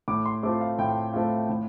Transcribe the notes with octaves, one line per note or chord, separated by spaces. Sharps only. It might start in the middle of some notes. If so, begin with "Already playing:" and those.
A2 D6
C6
A3 C4 F4 D6
F5
A2 G5
A3 C4 F4 F5
A2